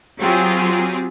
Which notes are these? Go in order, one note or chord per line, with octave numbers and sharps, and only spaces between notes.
F#3 C4 F4 G4 G#4